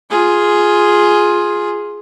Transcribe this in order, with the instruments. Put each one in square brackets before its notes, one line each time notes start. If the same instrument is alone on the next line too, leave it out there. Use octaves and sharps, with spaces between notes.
[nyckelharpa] F4 G#4